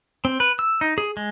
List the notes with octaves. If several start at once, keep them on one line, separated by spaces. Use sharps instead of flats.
C4
B4
E6
D#4
G#4
G#3